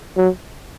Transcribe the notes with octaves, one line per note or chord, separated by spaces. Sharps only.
F#3